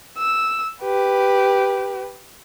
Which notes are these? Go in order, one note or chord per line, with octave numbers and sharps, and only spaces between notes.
E6
G4 B4